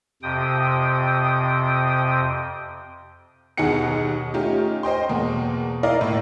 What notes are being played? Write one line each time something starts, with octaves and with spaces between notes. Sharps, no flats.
F2 C3 G5 D#6
D#2 B2 D#4 G#4 F#5 C#7
A3 C#4 D#4 F4 G4
C5 D#5 G5 C6
E2 B2 A#3
E4 A#4 D5 D#5 F5
A2 A#3